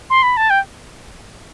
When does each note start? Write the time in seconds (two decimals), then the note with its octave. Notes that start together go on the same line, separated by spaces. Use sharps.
0.10 C6
0.23 B5
0.37 A5
0.50 G5